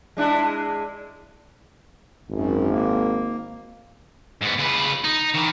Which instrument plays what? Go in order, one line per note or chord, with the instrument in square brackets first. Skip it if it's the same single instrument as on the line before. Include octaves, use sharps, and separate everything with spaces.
[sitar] G#3 D4 E4
[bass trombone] G#1 [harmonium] F#2
[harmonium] A#3
[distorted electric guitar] G#2 B3
C#3 B4
D#4
D#3 E3